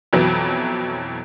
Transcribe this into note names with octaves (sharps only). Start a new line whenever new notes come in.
F2 B2 E3 F#3